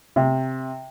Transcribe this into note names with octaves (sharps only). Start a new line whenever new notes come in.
C3